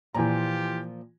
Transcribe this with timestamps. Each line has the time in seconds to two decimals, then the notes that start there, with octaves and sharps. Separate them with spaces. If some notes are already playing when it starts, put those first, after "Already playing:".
0.14 A#2 E3 F3 F4 G4 G#5 A#5